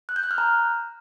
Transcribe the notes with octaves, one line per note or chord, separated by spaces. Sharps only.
F#6
G6
F#6
F6
A#5